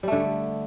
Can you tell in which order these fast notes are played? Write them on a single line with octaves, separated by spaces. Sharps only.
G3 A3 D3